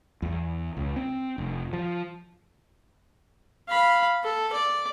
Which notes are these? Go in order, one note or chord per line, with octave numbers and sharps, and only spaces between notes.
E2
C#2
C4
F1
F3
F5 B5
A4
D5